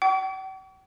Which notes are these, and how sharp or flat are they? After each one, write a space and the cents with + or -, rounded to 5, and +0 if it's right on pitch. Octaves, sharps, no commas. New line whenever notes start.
G5 -45 C#6 +45